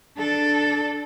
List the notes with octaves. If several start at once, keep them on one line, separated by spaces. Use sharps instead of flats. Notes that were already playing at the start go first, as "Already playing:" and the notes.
D4 A4